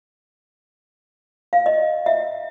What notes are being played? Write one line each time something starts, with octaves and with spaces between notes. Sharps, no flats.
F5
D#5
E5